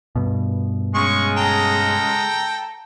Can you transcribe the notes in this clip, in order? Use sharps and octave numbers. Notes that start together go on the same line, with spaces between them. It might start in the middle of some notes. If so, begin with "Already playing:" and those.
G2 B2
C#3 G#3 C#6
A4 G5 A#5